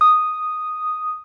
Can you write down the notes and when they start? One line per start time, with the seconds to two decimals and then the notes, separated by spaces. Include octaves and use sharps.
0.01 D#6